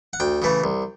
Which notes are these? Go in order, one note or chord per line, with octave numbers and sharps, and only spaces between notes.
F#5
D2 G5
C#3 E3 A3
C2